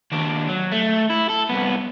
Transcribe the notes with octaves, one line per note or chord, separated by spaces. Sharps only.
D#2 D4
F#3
A3
E4
A4
C2 B3